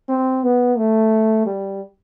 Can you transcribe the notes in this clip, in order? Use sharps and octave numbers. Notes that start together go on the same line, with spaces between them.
C4
B3
A3
G3